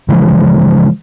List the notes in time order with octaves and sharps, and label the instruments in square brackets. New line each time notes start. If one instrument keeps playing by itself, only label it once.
[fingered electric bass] C#3 E3 F3 G#3